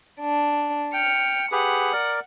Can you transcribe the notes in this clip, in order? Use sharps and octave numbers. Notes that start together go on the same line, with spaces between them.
D4
G5 F6 C#7
G4 G#4 B4 F#5
A#4 D5